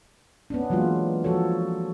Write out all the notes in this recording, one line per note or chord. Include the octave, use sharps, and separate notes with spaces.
B3 C#4 D4
E3 F#3 G#3 A#3 F4
F3 F#4 A4 C#5